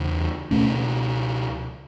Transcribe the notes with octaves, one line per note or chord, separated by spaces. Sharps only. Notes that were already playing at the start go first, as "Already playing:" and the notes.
Already playing: E2 C#3
C#2 B2 A3 C#4